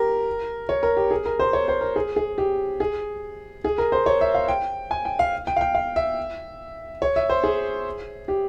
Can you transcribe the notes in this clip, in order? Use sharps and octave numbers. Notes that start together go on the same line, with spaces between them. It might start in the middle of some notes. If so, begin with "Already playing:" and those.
Already playing: G4 A#4
C#5
A#4
G4
G#4
A#4
C5
C#5
C5
A#4
G#4
G#4
G4
G#4
G#4
A#4
C5
C#5
E5
F5
G5
G#5
G5
F5
G5
F5
G5
F5
E5
C#5
E5
C5
G#4
G4